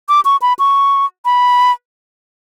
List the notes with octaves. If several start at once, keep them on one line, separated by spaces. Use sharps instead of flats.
D6
C#6
B5
C#6
B5